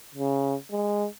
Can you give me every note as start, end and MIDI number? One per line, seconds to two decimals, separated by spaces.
0.15 0.55 49
0.72 1.07 56